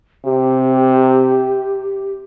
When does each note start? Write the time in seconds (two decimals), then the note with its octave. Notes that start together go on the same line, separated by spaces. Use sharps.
0.25 C3 G4